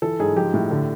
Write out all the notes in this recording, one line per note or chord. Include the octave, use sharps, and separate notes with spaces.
E3 A4
G#2 G#4
F3 G4
A2
D3